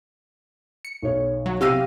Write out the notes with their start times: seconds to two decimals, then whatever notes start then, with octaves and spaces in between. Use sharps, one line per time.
0.85 C#7
1.02 B1 C#5
1.46 F#3
1.61 C3 G4 F5 E6 A#6 D#7